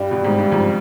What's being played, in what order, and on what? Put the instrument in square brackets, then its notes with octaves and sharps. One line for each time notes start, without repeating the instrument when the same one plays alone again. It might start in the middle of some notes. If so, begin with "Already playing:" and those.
Already playing: [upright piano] G2 [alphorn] G3
[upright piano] B2
G#2
G2
F2 G#2